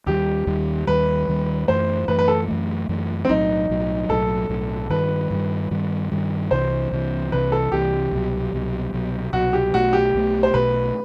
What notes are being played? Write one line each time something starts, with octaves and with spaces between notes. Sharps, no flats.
D#2 D#3 G3 G4
D#2 D#3 G3
D#2 D#3 G3 B4
D#2 D#3 G3
F#2 E3 A3 C5
F#2 E3 A3 B4
B4
A4
F#2 E3 A3
F#2 E3 A3
C4
B1 A2 F#3 D#4
B1 A2 F#3
B1 A2 F#3 A4
B1 A2 F#3
G2 D#3 G3 B4
G2 D#3 G3
G2 D#3 G3
G2 D#3 G3
C2 C3 E3 C5
C2 C3 E3
C2 C3 E3 B4
A4
C2 C3 E3 G4
C2 B2 F#3
C2 B2 F#3
C2 B2 F#3
C2 B2 F#3 F#4
G4
B1 B2 A3 F#4
G4
B1 B2 A3
C5
B1 B2 A3 B4